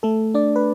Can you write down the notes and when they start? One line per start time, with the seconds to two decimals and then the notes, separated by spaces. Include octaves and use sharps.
0.03 A3 A4
0.34 D4 D5
0.56 B4